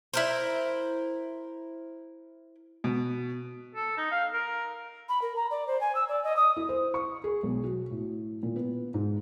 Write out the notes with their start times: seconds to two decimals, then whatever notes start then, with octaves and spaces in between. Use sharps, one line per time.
0.14 E4 A#4 C5
2.84 B2
3.75 A4
3.97 D#4
4.12 F5
4.34 A#4
5.09 B5
5.22 A#4
5.36 A#5
5.51 D5
5.67 C5
5.81 G#5
5.95 E6
6.08 D5
6.24 D#5
6.36 D#6
6.56 E4
6.69 C5
6.94 C#6
7.24 G#4
7.43 B1
7.64 F#4
7.91 A2
8.43 A#2
8.56 B3
8.94 G#2